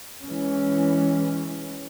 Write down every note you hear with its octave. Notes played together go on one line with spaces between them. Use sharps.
E3 G#3 C#4